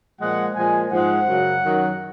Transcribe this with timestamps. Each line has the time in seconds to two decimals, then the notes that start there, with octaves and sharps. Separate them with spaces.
0.20 A#2 F3 G#3 F#5
0.56 A#2 F3 G#3 G#5
0.91 G#2 F3 G#3 F#5
1.27 F#2 C#3 F#3
1.62 F#2 D#3 F#3